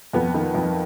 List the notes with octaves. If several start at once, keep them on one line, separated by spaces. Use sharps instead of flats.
F2 B3
D#3
F2